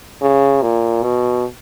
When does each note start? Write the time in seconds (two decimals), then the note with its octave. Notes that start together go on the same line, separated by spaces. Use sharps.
0.22 C#3
0.62 A#2
1.03 B2